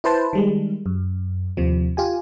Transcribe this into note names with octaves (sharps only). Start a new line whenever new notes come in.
E4 B4 C5 A5
D#3 G3 G#3
F#2
D#2 C3 F3
F4 G4 G#5